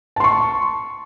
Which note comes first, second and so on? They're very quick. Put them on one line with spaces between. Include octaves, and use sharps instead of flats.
A5 C6 C#6